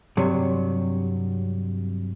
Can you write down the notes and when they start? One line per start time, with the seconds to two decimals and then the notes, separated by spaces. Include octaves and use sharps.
0.17 G2 C3 F#3